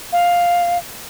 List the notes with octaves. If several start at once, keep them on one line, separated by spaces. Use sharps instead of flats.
F5